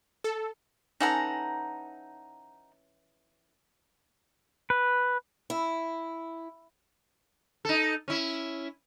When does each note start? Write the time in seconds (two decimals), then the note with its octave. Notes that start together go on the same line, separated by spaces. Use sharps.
0.24 A4
1.00 E3 C#4 D#4 A4 F#5 A#5
4.70 B4
5.50 E4
7.65 D#4 A4
8.08 C#4 E4